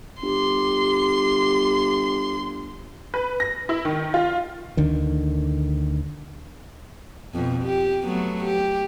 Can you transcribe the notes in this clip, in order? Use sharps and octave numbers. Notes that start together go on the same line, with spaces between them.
G1 G4 C6
B4
A#6
E4
D#3
F4
D2 D3 D#3
F2 B2
G4
F#3 A3 B3
G4